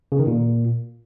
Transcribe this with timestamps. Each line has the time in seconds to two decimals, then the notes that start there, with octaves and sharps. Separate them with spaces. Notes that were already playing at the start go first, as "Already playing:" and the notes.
0.12 C#3
0.19 D#3
0.27 A#2